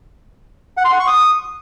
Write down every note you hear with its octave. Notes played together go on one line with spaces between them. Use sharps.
F#5
C6
F#5
C#6
D#6